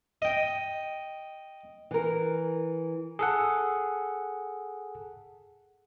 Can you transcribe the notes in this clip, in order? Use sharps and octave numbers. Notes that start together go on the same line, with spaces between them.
D#5 G5
E3 A#4
G#4 A4 F#5